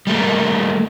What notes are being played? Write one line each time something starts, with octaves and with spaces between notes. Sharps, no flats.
G3 A3 A#3